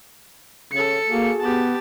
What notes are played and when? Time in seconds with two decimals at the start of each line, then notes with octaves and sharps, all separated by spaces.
0.73 C#3 A4 C#7
1.10 A#3 F#4 G#4
1.40 B3 G4 A5